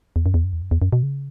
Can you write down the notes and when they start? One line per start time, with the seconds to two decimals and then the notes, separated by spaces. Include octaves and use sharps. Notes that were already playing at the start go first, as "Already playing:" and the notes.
0.16 E2
0.26 F#2
0.34 E2
0.44 F#2
0.53 E2
0.62 F#2
0.71 E2
0.82 F#2
0.93 B2
1.03 C#3